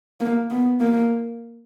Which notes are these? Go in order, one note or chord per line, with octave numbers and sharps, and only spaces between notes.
A#3
B3
A#3